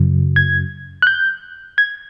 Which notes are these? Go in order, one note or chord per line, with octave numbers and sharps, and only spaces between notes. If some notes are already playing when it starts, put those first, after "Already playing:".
Already playing: F#2 C#3 F#3
G#6
F#6
G6
G#6